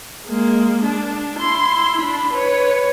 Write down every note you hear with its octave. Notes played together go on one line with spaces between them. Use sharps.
G#3 A#3
D4
E4 C6
D4 B5
B4 C#5